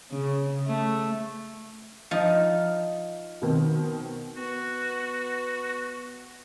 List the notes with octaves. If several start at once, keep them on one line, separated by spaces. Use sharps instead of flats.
C#3
A3
F3 D#4
B2 D#3 C4
B3 F#4